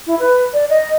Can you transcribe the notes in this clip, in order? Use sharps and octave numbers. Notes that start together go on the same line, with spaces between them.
E4
B4
D5
D#5